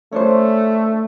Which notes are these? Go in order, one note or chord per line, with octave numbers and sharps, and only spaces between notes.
A3 C#4 D4 C5